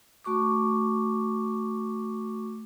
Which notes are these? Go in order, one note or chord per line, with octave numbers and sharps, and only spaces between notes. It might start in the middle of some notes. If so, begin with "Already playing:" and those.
A3 F#4 C#6 D6